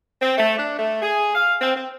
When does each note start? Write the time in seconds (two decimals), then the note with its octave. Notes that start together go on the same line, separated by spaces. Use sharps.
0.20 C4
0.36 A3
0.57 D4
0.77 A3
1.02 G#4
1.34 F5
1.60 C4
1.75 C4